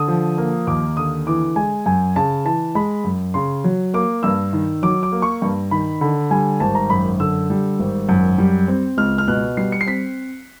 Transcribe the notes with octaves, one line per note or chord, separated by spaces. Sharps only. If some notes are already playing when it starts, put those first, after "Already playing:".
Already playing: D3 D#6
F3
A#3
D#2 D6
D3 D#6
E3 D6
G#3 G#5
F#2 G#5
C#3 A5
E3 A5
G#3 B5
F#2
C#3 C6
F#3
A#3 D6
G2 E6
D#3
F#3 D6
D6
A#3
C#6
G2
D#3 B5
D3 B5
G3 G#5
G#1 A5
A#5
F#2 B5
D3 E6
G3
G#1
F#2
G3
C4
C#2 F6
F6
B2 F#6
G3 C7
C#7
C7
C4 B6